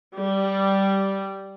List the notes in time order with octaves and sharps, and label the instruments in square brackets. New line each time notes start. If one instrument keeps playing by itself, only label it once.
[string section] G3